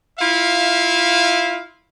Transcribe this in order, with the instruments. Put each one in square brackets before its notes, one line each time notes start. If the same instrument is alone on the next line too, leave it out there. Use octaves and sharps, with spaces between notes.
[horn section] E4 F4 E5 F5